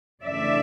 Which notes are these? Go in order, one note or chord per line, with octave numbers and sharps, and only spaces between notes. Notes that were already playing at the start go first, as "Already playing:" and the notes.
F2 C#3 E3 A3 D4 D5 E5